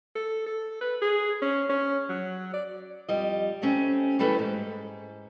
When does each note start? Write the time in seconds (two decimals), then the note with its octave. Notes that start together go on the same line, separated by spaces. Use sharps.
0.15 A4
0.46 A4
0.81 B4
1.02 G#4
1.42 C#4
1.69 C#4
2.09 F#3
2.54 D5
3.09 F2 G3 D#5
3.62 G3 A3 C4 C#4
4.19 E3 G3 A3 A4 B4 C#5
4.39 G#2